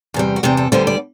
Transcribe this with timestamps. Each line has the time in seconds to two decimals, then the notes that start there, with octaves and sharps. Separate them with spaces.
0.14 E2 C3 G3
0.36 F#4
0.43 E2 C3 G3 G4
0.57 A4
0.72 D2 D3 G3 B3 C5
0.87 D5